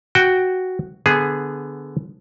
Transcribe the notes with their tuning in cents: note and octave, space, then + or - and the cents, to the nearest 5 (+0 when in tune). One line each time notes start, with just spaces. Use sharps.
F#4 +0 G5 +0
D3 +0 B3 +0 G#4 +0